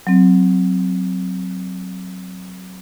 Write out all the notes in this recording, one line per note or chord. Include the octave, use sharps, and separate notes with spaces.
F#3 C4